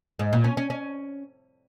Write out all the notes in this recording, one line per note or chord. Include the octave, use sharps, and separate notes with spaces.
G#2
A#2
C#4
C#4
C#4